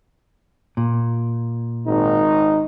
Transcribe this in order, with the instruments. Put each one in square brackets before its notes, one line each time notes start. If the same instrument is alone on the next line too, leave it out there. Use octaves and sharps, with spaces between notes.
[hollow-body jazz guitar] A#2
[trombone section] G#1 D#4